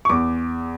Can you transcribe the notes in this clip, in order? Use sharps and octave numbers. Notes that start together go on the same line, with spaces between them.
C#6
E2 D6